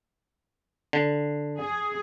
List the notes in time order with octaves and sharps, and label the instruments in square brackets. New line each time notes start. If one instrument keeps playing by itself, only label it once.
[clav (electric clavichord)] D3
[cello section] G#4